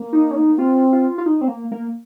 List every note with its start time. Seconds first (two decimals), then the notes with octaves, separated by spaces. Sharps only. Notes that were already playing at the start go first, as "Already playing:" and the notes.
Already playing: A#3
0.13 D#4
0.31 C#4
0.35 D#4
0.49 A#3
0.58 C4 F4
0.93 F4
1.18 F4
1.26 D#4
1.41 C4
1.48 A#3
1.72 A#3